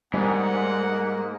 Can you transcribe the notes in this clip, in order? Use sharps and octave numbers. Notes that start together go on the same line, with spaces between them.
G#2 G3 A#3 F#5